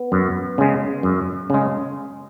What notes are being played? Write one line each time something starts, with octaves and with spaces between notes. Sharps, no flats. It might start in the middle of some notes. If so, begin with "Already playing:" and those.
Already playing: B3
F#2
C#3 G#3
F#2
C#3 G#3